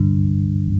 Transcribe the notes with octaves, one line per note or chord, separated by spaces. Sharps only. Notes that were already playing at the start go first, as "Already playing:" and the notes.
Already playing: G2 D3 G3 D4